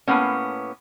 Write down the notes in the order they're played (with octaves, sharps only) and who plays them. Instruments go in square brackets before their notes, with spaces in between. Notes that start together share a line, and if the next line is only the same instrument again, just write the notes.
[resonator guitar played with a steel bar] A2 E3 A#3 B3 C#4